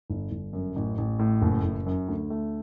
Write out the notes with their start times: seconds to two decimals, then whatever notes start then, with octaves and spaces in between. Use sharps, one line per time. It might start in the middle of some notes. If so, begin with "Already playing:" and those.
0.10 G1
0.31 G1
0.53 F#2
0.76 A1
0.98 A1
1.19 A2
1.42 F#1
1.63 F#1
1.86 F#2
2.08 D2
2.30 A3